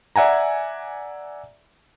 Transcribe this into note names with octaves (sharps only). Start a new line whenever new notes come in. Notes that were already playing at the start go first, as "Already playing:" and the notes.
D5 E5 F#5 G#5 A#5